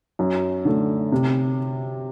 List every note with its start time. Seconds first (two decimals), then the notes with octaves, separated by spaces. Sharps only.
0.19 F#2
0.65 D3 A3
1.12 C3